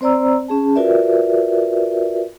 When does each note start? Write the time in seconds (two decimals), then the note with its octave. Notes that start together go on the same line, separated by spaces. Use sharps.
0.01 C4 C5 D5 A#5 E6
0.48 C#4 G#4 A5
0.76 F4 F#4 A#4 B4 D5 E5